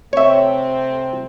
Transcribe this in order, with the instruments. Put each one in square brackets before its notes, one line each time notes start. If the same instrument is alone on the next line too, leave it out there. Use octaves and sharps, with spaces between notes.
[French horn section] C3 A3 C4 [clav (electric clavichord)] C#5 E5